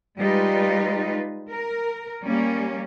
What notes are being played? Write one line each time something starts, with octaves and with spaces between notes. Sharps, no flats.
G3 G#3 D#4 F4 B4
A#4
G3 A#3 C#4